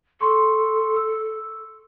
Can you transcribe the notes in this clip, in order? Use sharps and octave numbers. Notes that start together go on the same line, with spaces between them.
A4 C6 C#6
E6